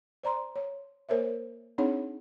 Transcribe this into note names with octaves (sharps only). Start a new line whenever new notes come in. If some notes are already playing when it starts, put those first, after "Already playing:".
C5 D5 A#5 C6
C#5
A#3 A#4 C5 C#5 E5
C4 D4 D#4 G#4 C#5 F#5